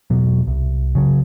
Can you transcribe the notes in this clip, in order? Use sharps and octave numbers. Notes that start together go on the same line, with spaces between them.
E1 B2 F#3
C2
C#3 F#3